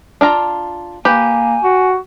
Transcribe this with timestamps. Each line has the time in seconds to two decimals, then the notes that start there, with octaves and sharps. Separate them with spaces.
0.21 D4 F4 A#5
1.05 A#3 G4 B4 G#5
1.63 F#4